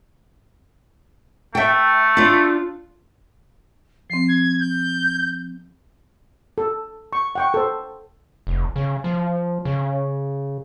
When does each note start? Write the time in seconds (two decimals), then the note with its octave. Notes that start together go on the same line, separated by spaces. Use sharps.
1.55 A3 E5 G5
2.17 D4 F4
4.10 F3 C4 C7
4.29 G#6
4.60 G6
6.58 A4
7.13 C#6
7.35 F#5 G5 C#6
7.54 A4 C5
8.47 F1
8.76 C#3
9.04 F3
9.65 C#3